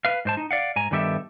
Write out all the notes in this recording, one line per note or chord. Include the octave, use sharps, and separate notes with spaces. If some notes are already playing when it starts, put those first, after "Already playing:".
B4 F5
G#2 C5 A5
D#4
D5 F5 F#5
G#2 G#5 A#5
G2 D#3 B3 G4 A4 E5